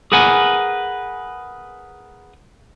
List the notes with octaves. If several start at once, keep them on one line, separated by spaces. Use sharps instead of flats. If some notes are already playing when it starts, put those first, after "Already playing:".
G#4 A#4 B4 F#5 G#5